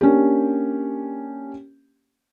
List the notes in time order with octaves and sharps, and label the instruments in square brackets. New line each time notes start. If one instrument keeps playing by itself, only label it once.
[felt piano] A#3 C#4 D4 G4